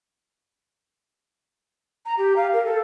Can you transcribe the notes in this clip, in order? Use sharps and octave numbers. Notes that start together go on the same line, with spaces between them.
A#5
G4
F5
A#4
A4